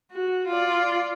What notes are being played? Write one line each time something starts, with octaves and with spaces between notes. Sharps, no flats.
F#4
F4 D5